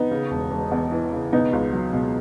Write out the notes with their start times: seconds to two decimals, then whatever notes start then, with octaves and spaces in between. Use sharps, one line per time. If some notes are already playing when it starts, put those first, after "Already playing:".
Already playing: B3 D#4
0.11 C#3
0.31 E1
0.51 E1
0.72 E2
0.92 E3
1.12 C#3
1.32 B2 B3 D#4
1.53 C#2
1.73 F#3
1.93 B2